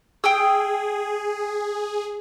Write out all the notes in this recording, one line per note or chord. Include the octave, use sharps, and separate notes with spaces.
G#4 G5 D#6 E6